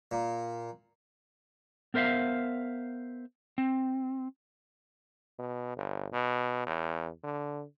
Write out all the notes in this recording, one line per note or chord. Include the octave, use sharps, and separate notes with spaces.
A#2
B3 A#4 C5 E5 F5
C4
B2
G1
B2
E2
D3